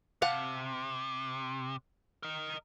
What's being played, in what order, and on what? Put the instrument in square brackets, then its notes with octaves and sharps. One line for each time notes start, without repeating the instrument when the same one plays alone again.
[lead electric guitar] C3 [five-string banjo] F5 F#5 A5
[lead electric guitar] A#4 D#5